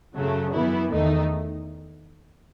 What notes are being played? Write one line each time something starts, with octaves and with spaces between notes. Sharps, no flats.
F#2 C#3 F#3 A3
F#2 E3 B3 E4
E2 D#3 A3 D#4